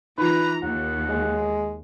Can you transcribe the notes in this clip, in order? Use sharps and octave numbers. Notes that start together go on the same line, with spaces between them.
E3 D#4 F4 B4 A#5
D#2 F#5
G#3